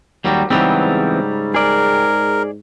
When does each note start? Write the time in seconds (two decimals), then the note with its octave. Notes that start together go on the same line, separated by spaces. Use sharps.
0.24 D#2 F#3 G3
0.50 G#2 C#3 E3 F#3 G3 B3 C4
1.54 G#4 A#4 D5